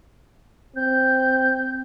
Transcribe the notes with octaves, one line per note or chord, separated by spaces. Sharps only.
C4 G6